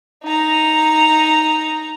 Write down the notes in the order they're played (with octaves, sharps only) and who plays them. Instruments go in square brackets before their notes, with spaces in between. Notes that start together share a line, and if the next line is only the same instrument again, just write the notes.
[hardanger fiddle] D#4 A#5